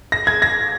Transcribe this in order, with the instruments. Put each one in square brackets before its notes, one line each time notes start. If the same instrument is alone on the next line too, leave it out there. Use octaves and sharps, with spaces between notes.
[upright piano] A#6
G#6
A#6